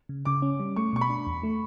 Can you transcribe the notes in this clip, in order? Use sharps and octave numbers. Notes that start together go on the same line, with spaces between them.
C#3
C#3 D6
C#4
G3
A3 C#6
B2 C#6
B5
D4
E2
A3